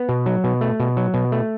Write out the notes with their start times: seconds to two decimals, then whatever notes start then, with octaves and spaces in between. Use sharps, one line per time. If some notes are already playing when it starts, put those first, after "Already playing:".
Already playing: B3
0.09 B2
0.26 F#3
0.44 B2
0.61 A3
0.80 B2
0.97 F#3
1.14 B2
1.32 A3